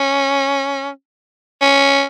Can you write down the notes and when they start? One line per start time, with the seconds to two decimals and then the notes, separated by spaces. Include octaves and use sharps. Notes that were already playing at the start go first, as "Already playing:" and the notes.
Already playing: C#4
1.61 C#4